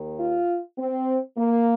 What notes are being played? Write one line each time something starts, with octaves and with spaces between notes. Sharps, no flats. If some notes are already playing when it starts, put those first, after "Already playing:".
Already playing: D#2 D#3
F4
C4
A#3